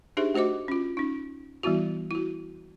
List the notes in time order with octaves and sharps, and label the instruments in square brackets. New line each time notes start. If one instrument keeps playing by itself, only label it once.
[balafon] D4 D#4 G4 G#4 C5 E5
A3 F#4 C5 D#5 D6
C#4 F4
C#4 D#4
E3 G3 B3 E4 F#4
E4 F#4